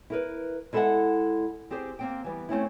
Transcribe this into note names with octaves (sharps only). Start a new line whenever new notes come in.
E4 A#4 B4
G#3 E4 A4 D5 E5 F#5
C4 G4 G#4 C5
A#3 C4 G5
E3 G3 B3
A3 C4 C#4 E4